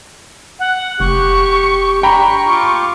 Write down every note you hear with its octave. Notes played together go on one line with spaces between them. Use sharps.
F#5
F1 G4 C#6
D4 G5 A#5 B5 C#6
F4 D6